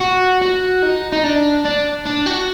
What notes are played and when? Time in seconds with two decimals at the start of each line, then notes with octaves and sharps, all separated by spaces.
0.01 F#4
0.42 F#4
0.83 D#4
1.12 D#4
1.24 D4
1.65 D4
2.06 D4
2.26 F#4